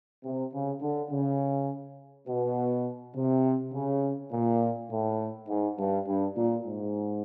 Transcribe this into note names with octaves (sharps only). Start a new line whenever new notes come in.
C3
C#3
D3
C#3
B2
C3
C#3
A#2
A2
G#2
G2
G2
A#2
G#2